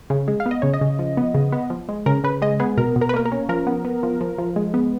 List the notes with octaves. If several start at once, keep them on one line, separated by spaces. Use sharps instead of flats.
C#3
G#3
F5
B3
D#5
C#3 C#5
D#5
C#3
F3
B3
C#3
B3
F3
G#3
C#3 A#4
C#3 B4
G#3 D#5
B3 G#4
B2 A#4
B2
A#4
B4
A#3 A#4
A#4
C#4
F3 A#4
B3
B3
F3
F3
F3
G#3
B3